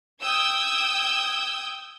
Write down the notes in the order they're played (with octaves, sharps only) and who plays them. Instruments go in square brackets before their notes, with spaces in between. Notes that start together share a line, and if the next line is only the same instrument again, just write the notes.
[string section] G5 D#6 E6 G6 G#6